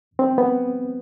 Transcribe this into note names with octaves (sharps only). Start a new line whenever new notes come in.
C4
B3